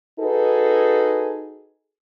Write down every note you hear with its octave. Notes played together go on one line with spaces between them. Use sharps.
D#4 F#4 G#4 A4 B4